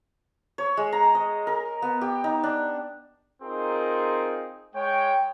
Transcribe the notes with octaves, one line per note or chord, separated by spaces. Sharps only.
C#5
G#3
A#5
D#5
A#4
B3
G4
D#4
D4
C4 D#4 F4 G#4 A#4
G#3 C#5 G5